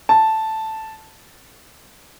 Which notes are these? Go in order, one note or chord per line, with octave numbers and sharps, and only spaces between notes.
A5